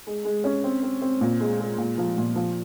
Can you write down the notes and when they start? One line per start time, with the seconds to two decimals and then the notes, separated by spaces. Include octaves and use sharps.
0.07 G#3
0.25 G#3
0.44 C#4
0.64 C4
0.83 C4
1.02 C4
1.21 A#2
1.40 G#3
1.60 G#3
1.78 A#2
1.98 F3
2.18 A#2
2.36 F3